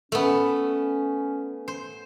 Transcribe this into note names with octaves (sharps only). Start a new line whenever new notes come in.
A3 B3 C#4
C5